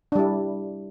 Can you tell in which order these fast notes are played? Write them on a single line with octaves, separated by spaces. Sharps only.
D4 G3 E4